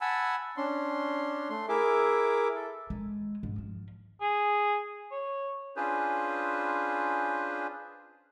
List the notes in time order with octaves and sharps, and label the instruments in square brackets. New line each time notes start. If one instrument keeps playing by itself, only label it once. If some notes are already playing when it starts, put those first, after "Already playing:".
[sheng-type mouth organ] F#5 G#5 A5 B5 E6
C#4 D4 C6
A3 C6
E4 G#4 A#4 E5 D6
A4
[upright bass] G#3
G#2
F3
[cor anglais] G#4
C#5
[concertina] C#4 D4 F4 G#4 B4 C5